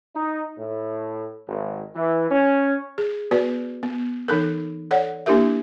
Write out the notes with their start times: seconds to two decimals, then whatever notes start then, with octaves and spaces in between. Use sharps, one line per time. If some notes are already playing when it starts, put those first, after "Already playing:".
0.14 D#4
0.58 A2
1.48 G#1
1.95 E3
2.31 C#4
2.98 G#4
3.31 B3 F#4 B4 D5
3.83 B3
4.28 E3 D#4 A4 A#4
4.91 A4 C#5 D5 F#5
5.26 A#3 D4 E4 G4 A#4 E5